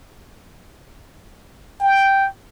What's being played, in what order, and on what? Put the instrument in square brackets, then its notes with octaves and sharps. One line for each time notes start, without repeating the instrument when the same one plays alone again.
[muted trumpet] G5